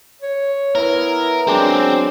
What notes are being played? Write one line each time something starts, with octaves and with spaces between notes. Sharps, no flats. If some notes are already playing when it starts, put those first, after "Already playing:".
C#5
B3 E4 A#4
F#3 G#3 C4 D4